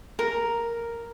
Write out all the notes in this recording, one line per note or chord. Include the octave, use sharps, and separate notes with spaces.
A#4